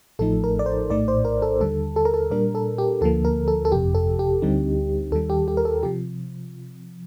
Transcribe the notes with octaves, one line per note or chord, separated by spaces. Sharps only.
A1 A2 F3 A3 D#4 A4
A#4
D5
C5
A#1 A2 A3 D#4 D5
C5
A#4
A4
D#2 D3 G3 A4
A4
A#4
A4
A#2 G3 D4 A#4
A4
G4
D2 D3 F3 A#3 A4
A#4
A4
A4
G1 F2 C3 G4
A4
G4
D2 D3 G3 C4 D#4
D#2 D#3 G3 A4
G4
G4
A#4
A4
C3 F3 G4